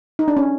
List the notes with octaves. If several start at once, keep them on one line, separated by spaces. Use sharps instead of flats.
D#4
D4
C#4